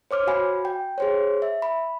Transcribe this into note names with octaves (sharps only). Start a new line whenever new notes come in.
C5 C#5 D6 F6
F#4 F5 G#5 B5
G5
G#4 C5 C#5
E5
B5